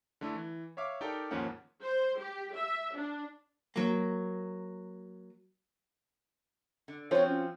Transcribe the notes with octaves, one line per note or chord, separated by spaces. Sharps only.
D3 A3 E4
E3
C#5 E5 F5 D6
D#4 G4 A4 A#4 D5 G5
D#2 G#2 F3 A#3 C#4 F#5
C5
G4
E5
D4
F#3 A#3
D3
F3 C4 F4 F#4 C5 C#5
C#4